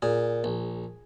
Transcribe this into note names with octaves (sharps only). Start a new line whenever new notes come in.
A#2 G#4
A#1